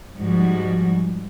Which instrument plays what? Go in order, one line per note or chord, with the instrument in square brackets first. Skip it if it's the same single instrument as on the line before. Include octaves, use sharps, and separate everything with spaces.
[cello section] G#2 F3 G3 G#3 F#4